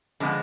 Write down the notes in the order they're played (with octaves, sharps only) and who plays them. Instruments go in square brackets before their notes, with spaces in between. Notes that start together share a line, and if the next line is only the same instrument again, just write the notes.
[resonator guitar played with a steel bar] D3 F3 G#3 B3